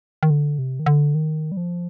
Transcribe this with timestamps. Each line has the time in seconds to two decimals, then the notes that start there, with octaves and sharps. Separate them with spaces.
0.23 D#3
0.30 D3
0.59 C3
0.80 D#3
0.86 D3
1.15 D#3
1.52 G3
1.57 F3